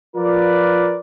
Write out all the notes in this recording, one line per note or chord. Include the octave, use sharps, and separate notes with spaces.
F3 F4 A#4 B4 D5